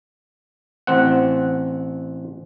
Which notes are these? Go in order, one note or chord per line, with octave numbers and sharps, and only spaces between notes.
A1 C4 F#5